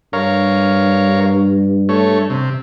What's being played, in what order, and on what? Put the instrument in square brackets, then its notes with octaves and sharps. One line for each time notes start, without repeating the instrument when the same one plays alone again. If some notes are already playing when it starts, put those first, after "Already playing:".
[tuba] G2 [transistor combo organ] A#4 C#5 F5
[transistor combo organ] A3 C#5
C3